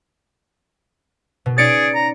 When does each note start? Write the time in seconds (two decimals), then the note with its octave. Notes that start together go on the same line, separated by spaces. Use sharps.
1.46 B2
1.58 C#4 D#4 G#4 D5 A6 C#7 D7
1.95 A#5